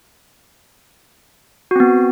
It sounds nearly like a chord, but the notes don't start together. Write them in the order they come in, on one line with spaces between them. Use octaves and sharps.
F#4 C4 B3